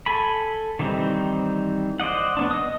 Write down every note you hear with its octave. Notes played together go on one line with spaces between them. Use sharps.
A4 G#5 B5
D#3 E3 G3 C4 D#4
C5 D5 D#5 F#5
B3 C#4 D4
D#5 D#6